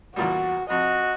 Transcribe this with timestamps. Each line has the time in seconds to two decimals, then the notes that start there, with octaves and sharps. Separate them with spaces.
0.16 E2 A#2 G3 F#4
0.70 F2 F#4 D#5